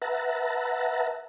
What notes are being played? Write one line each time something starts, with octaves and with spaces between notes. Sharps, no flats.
B4 E5 F#5 A5 A#5